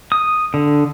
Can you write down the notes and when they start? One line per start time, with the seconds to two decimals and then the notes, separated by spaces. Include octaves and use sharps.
0.12 D#6
0.54 D3